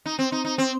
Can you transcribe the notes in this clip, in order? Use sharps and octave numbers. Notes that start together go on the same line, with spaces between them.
D#4
C4
D#4
D#4
C4